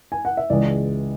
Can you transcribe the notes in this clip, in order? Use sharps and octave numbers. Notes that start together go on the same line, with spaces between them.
G#5
F#5
E5
C#2 C#3 E3 G#3 C#4 D5